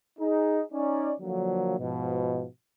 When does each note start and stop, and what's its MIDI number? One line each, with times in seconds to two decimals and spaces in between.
0.19 0.62 63
0.19 0.62 68
0.72 1.12 61
0.72 1.12 63
0.72 1.12 74
1.21 1.76 50
1.21 1.76 53
1.21 1.76 54
1.21 1.76 58
1.78 2.45 44
1.78 2.45 47
1.78 2.45 53